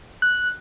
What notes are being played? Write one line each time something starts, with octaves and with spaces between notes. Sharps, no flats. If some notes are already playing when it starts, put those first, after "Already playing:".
F#6